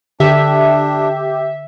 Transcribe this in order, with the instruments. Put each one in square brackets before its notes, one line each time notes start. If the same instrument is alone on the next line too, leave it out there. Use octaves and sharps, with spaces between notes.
[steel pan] D3 [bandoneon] D4 [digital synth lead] G4 [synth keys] E5